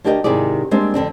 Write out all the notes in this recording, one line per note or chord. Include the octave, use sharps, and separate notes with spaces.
D2 D4 G4 A#4 D#5 G5
G#2 C3 D#3 E4 G#4 D5
G3 G#3 A#3 C4 D4
F2 D3 C4 D4